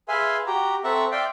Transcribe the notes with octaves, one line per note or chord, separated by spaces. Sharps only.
G#4 B4 E5 F5 G#5 C6
F#4 G4 A#5
C4 A4 E5 F#5 A#5 C#6
D5 E5 F5 G5 C6 D6